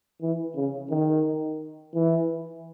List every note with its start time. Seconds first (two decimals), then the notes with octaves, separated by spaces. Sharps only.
0.21 E3
0.55 C#3
0.90 D#3
1.94 E3